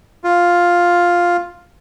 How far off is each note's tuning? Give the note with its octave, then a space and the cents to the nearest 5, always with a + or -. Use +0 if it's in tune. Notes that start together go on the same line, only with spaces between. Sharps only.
F4 +5